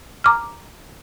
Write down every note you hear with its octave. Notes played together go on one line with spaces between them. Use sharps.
A#5 D6 F6